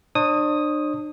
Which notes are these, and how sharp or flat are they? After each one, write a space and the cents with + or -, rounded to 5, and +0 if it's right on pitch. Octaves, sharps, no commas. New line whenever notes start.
D4 +40 C#5 -45 D#6 +0